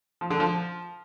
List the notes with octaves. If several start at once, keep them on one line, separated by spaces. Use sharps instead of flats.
F3
D3
F3